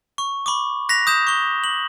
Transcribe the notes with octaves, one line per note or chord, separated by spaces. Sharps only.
C#6
B5 C#6 D6
F#6 A#6 B6 F7
D#6 G6 E7
C#6 G7
F#7